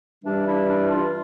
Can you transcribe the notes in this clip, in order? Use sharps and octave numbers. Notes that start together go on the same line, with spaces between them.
G2 E3 G3 D4
E4
D4
F4